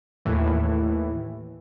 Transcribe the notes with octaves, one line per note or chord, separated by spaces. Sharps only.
D#2 A2 E3